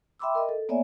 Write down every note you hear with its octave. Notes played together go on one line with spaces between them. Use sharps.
E5 G5 B5 C6 D6 E6
A#4 D#5
A4
A#3 B3 C#5 D5 E5 G#5